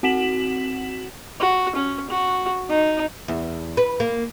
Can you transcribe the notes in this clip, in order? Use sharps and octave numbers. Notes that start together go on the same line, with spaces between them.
C4 F#4 F#5 B6 E7 F#7
F#4
C#4
F#4
D#4
E2
B4
A#3